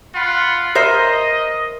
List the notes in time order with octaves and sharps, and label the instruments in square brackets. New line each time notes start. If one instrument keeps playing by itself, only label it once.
[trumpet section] F4 F#5 B5
[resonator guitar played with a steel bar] A#4 C5 E5 [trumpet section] D#5